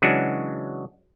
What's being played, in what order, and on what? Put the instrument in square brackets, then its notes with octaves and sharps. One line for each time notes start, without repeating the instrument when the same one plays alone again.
[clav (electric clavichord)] C#3 E3 F#3 G#3 D4 F#4